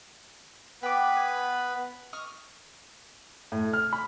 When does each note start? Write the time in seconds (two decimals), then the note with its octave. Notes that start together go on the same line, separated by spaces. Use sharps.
0.83 B3 B4 G5 B5 D6
1.16 G#5
2.13 D#5 C#6 F6
3.52 A2
3.73 F6
3.93 B5